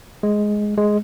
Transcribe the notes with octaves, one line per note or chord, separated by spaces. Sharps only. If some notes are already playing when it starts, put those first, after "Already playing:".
G#3
G#3